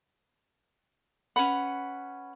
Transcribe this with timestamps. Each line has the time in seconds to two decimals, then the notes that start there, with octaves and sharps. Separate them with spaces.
1.36 C#4 B4 F#5 B5